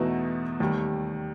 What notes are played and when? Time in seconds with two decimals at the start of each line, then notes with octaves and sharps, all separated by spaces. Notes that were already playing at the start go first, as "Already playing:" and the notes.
Already playing: E2 B2 A3 B3 D#4 F#4
0.60 D#2 D#3 G3 A3